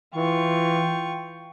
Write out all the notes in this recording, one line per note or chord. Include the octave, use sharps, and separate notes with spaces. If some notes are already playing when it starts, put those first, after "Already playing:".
E3 F4 G5 C#6